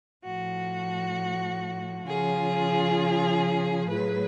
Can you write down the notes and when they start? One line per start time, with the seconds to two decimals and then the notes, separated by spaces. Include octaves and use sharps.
0.24 A2 F3 F#4
2.06 C#3 F3 F4 G#4
3.88 A2 F#3 G#4 B4